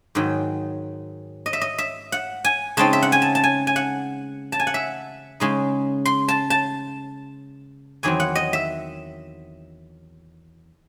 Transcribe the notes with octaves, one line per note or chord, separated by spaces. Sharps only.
G#2 D#3 F#3
D#5
E5
D#5
E5
F#5
G#5
C#3 G#3 C4 D#4 A5
E5
F#5
G#5
A5
A5
G#5
G#5
F#5
A5
G#5
F#5
E5
C#3 G#3 D#4
C6
A5
A5
E2 D#3 F#3 C4 G#5
F#5
D#5
E5